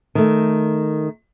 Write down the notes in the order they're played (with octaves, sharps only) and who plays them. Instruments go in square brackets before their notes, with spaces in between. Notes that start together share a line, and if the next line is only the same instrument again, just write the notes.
[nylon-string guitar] D#3 A3